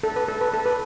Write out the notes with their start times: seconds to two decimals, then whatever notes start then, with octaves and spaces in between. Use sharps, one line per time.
0.03 A4
0.16 B4
0.28 A4
0.41 B4
0.54 A4
0.66 B4